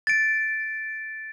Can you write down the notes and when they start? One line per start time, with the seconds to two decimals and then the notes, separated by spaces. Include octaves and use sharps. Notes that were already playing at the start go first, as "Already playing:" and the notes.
0.07 A6 D7